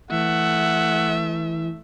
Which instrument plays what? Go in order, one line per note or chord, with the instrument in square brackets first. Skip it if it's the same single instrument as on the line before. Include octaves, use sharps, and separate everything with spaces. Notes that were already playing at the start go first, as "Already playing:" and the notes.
[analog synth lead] E3 [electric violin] A3 E5 [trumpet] F#5